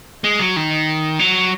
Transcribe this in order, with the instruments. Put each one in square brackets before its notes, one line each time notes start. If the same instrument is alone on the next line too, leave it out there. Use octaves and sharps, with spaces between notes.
[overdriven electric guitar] G#3
F#3
D#3
F#3